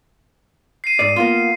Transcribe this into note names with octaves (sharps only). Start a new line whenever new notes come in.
C7 D#7
G#2 D5
A#3 B3 F4